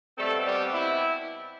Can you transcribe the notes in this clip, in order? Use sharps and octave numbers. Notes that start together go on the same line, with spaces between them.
B2 G3 A3 C4 A4
G3 G4
E4